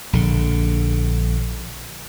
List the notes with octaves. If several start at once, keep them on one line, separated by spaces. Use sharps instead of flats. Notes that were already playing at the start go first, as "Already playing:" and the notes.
A#1 D3